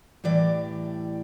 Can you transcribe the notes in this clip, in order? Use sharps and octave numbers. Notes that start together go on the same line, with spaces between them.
A2 E3 G3 D5